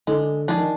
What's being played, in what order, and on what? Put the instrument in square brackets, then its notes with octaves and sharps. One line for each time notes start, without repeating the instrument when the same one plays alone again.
[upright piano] D3 [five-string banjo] G#3
[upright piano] F3 [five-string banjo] D4 G#4
[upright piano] D#3